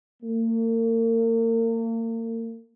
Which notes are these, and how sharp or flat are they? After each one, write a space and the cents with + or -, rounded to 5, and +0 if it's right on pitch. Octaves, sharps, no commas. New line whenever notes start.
A#3 -40